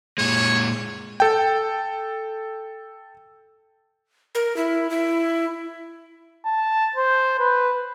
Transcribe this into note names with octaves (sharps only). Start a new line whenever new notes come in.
A#2 G#3 C#5
A4 G5
A#4
E4
E4
A5
C5
B4